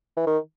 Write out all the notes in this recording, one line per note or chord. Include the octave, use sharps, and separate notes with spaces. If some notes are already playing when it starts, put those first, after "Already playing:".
E3
D#3